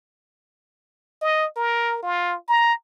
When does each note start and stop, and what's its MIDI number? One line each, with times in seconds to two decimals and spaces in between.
1.21 1.46 75
1.56 1.99 70
2.03 2.36 65
2.48 2.73 82